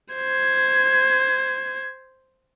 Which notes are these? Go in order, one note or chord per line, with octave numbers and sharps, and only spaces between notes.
C5 G#6